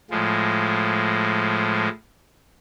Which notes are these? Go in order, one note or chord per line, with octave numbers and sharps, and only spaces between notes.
A2 F3 G#3